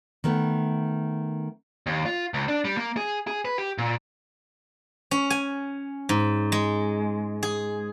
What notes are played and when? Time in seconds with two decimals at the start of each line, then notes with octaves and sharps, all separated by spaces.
0.24 D#3 A3 B3
1.86 D#2
2.06 F4
2.34 C#2
2.48 D4
2.65 G3
2.77 A#3
2.96 G#4
3.27 G#4
3.45 B4
3.58 G4
3.78 A#2
5.11 C#4
5.30 G#5
6.09 G#2
6.52 G#3
7.43 G#4